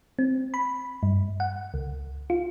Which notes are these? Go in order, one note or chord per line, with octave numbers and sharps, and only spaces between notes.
C4
B5
G2
F#5
C#2
F4